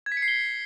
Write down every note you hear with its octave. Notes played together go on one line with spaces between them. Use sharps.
G#6
B6
C#7
C7
G7